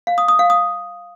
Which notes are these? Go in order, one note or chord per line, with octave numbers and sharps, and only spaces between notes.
F5
D#6
D#6
F5
D#6